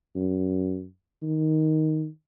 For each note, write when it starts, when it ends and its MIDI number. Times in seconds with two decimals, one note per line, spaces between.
0.16 0.86 42
1.23 2.07 51